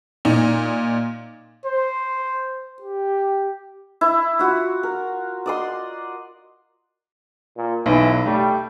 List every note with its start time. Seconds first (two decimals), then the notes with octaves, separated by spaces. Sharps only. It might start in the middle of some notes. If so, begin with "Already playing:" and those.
0.25 A#2 D#4
1.66 C5
2.82 G4
4.01 E4
4.39 F4 F#4
4.83 A#4
5.46 D5 D#5 C6
7.57 A#2
7.86 B1 E3
8.26 G3 A3